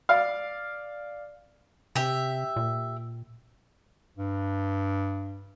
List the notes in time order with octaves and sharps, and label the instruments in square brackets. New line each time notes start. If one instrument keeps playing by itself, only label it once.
[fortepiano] D5 F5
[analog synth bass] C3 [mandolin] G4 E5
[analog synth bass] A#2
[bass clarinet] G2